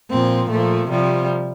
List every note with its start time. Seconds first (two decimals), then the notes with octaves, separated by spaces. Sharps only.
0.10 A#2 F3 C4
0.50 A#2 F3 A3
0.90 C3 F3 G3